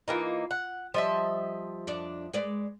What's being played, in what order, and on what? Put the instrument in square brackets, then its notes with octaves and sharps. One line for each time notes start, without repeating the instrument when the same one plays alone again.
[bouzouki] E3 A#3 D#4 [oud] F4
[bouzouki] F#5
[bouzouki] F3 D#5 E5 [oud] G3
[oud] F2 D4 D5
G#3 B4 D5